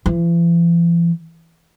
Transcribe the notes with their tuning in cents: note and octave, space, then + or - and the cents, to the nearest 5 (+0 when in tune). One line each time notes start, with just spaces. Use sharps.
E3 +45